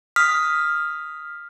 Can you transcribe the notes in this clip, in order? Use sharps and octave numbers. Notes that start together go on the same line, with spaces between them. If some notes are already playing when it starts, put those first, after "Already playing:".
D#6 F6 B6